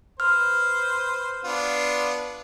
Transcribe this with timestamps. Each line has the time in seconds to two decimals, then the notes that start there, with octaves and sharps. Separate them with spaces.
0.20 B4 C5 F6
1.45 B3 D4 F4